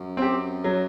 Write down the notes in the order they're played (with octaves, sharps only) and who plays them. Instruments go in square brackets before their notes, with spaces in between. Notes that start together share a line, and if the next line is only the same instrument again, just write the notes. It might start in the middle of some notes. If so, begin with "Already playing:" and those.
Already playing: [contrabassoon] F#2
[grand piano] C4 G4
F#3